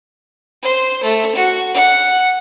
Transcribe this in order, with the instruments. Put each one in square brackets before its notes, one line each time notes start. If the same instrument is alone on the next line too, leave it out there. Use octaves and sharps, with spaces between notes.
[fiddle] C5
A3
F#4
F#5